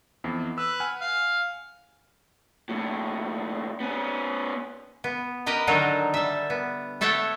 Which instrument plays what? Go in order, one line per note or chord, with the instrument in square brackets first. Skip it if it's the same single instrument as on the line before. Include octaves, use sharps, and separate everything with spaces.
[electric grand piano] F2 E3 B3
[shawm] B4 [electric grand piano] E6
[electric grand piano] F#5 G#5 F6
[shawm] F5
[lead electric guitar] B1 A2
B3 C#4
[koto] B3
G4 A#4 B4 D#5
D3 D#3 F#3 D4 D#4
G3 E5
B3
A3 A4 C#5 E5 F#5 G5